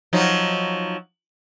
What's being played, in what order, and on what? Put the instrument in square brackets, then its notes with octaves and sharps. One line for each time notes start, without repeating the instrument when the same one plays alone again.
[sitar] F3 F#3 D#4